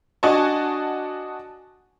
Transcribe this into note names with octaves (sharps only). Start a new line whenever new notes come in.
D4 F#4 D#5 G#5 A5 C#6